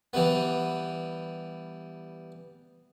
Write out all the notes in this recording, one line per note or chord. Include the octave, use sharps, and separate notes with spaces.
E3 G3 B3